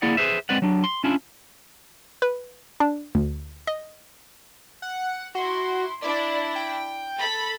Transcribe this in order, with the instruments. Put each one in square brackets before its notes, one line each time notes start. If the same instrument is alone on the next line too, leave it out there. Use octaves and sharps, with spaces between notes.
[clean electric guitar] A#3 E4 G#4 D5 F#5
G#4 B4 C5 E5
G#3 C4 B4 D5 F#5
F#3 D4
C6
C#4 D4 E4 F4
[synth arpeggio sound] B4
D4
D2
D#5
[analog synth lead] F#5
[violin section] E4 C6 [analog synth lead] F#4
[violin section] D4 E4 [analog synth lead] D5
[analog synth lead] G5
[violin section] A4 B5 B6